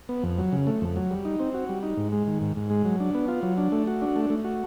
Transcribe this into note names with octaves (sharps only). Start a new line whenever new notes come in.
B3
F2
F#3
C#3
A3
F2
F#3
G3
D#4
C4
F#4
G3
D#4
G#2
G#3
D#3
G#2
G#2
G#3
F#3
D4
B3
F4
F#3
D4
A3
F#4
D4
A3
A3
F#4